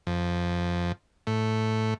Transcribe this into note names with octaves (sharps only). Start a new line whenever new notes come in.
F2
A2